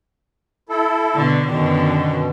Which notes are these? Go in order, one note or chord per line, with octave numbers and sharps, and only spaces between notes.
E4 A4
B2 D3
F#2 B2 D3 D#3